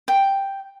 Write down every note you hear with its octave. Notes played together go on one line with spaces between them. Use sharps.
G5